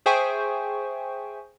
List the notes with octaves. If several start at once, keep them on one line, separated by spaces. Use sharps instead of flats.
G#4 C5 E5 G5 G#5 C#6